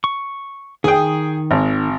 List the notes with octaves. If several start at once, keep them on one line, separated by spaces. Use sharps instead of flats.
C#6
D#3 G#4 G5 D#6
G#1